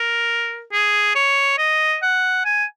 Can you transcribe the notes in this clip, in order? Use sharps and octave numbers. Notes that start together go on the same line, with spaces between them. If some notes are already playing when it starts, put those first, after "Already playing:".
Already playing: A#4
G#4
C#5
D#5
F#5
G#5